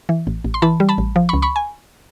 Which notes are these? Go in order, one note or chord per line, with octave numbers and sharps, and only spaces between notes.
E3
A1
A1
C6
E3 A5 B5
G3
A5 B5
A1
F3
C#2 B5 C#6
B5 C#6
G#5